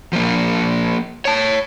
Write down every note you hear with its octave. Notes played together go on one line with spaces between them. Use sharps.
F3 A#3
C#5 A5